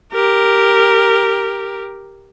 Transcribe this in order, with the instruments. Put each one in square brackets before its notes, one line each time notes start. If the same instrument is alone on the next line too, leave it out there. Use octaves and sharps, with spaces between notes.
[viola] G4 A#4